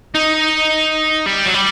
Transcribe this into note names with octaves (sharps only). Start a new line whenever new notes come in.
D#4
G3
F#3
G3